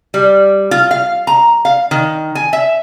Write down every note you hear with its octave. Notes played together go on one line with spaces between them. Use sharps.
G3
F4
F5
A#5
F5
D#3
G#5
E5